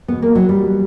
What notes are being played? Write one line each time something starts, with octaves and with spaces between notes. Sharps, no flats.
E2 B2 B3
A#3
F#3
G3